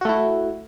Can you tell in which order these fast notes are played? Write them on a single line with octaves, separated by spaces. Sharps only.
F#4 A3 E4